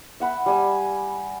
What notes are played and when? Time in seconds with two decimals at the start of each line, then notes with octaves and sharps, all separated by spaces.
0.20 E5 F#5 B5
0.46 G3 G#5 E6